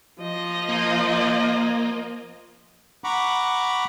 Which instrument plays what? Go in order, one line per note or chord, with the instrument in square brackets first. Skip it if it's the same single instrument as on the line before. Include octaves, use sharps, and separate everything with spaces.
[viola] F3 D#5
[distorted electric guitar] A#3
[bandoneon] F#5 A#5 B5 C#6 D6